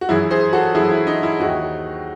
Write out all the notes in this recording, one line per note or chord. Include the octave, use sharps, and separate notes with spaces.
F#4
F#2 E3 E4 G#4
G#4 C5
F#4 A4
F#2 E3 E4 G#4
E4
D#4
E4
D#2 D#3 D#4 F#4